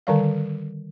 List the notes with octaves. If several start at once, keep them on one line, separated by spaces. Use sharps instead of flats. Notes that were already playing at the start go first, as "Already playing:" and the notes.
D3 D#3 G3 F5